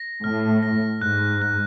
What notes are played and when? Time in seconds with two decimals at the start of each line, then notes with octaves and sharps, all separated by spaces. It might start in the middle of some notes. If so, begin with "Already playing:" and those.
Already playing: A#6
0.24 A2 F6
0.63 A#6
1.02 G#2 F#6
1.42 F#6